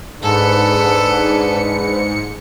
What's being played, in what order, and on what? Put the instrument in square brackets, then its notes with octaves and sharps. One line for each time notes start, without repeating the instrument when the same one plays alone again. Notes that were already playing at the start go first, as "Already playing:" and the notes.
[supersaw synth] G#2 C#7 [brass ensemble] D4 G#4 B4 [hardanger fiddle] A4